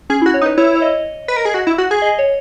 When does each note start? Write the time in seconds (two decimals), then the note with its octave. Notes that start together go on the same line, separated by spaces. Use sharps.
0.10 C#4 G#4
0.22 E4
0.26 F#4
0.34 C#5
0.41 D#4
0.46 B4
0.58 E4 C#5
0.76 C#5
0.82 D#5
1.28 B4
1.37 A#4
1.45 G#4
1.54 F#4
1.67 E4
1.78 F#4
1.91 G#4
2.02 D#5
2.19 C#5